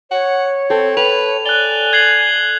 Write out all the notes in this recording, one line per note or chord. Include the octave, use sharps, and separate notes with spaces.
C#5 F#5
C4 A4
B4 G5 F7
D5 G#5 F#6 G7
G#6 C7 F#7